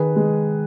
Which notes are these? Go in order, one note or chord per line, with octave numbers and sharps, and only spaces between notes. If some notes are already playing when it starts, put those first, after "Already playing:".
Already playing: D#3 G#4 B4
G#3